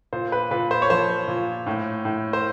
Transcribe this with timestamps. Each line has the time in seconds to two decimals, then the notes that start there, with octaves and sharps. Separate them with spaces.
0.13 A#2 C5
0.32 B4
0.51 A#2 B4
0.71 C5
0.82 C#5
0.90 F3 C5
1.28 A#2
1.67 A2
2.05 A2
2.33 C5